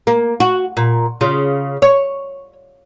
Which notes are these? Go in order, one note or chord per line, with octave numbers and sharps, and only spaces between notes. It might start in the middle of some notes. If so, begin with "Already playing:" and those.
A#3
F#4
A#2
C#3 F4
C#5